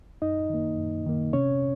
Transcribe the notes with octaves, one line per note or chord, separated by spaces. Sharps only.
F#2 D#4 D#5
D#3 A#3
F#2
D#3 A#3
C3 C#4 C#5